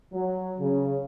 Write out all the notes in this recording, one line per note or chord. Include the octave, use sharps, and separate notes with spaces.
F#3
C#3